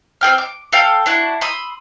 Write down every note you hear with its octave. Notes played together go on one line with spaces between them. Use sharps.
C4 G#4 G5 F6
D6
A4 F5 G5
D4 E4 F#4
B5 C6 D#6 E6